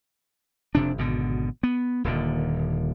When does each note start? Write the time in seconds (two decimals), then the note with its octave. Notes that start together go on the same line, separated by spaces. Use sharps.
0.75 F1 C3 D4
0.98 G#1 B2 D3
1.63 B3
2.04 D#1 D#2 D3